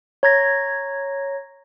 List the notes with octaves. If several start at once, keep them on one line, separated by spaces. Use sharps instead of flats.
C#5 A#5 G#6 A#6